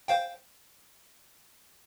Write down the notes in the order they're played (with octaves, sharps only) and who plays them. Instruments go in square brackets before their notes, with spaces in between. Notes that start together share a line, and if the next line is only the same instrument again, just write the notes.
[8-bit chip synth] C5 F5 G5